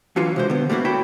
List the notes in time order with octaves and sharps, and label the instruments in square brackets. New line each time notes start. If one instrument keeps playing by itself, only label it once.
[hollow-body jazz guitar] D2 D3 E3 F#3 F4 F#4
C3 G#3 C5
D3 B3
G3 A3 A#3 E4 F#4
E4 F#4 C#5 G5 A5 B5